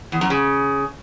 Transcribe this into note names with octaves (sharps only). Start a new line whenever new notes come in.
E2
F#2
C#3